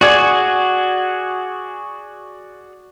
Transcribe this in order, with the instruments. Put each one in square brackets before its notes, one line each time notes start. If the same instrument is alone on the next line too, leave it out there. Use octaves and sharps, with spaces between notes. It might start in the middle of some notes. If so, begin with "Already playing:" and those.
[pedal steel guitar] F#4 G#4 [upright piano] D5 G#6